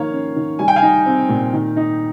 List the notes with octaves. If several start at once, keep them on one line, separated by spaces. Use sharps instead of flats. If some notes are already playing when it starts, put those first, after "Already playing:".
Already playing: D#3 F3 A#3 C#5 F5
C#4
D#3
G3 G#5
G5
F5 G#5
D#4
C4
A#2
D#3
D#4